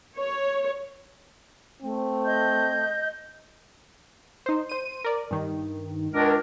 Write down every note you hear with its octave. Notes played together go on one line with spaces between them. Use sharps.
C#5
A3 C4
D#5 G6
D#4 C5
C5 D#7
A#4 D5
G2 D#3
C#2 D4 A#4